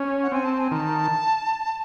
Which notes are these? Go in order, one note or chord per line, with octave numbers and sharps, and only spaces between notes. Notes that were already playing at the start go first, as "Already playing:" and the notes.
Already playing: C#4
F#5
C4 G#5
A5
G#5
D#3 A5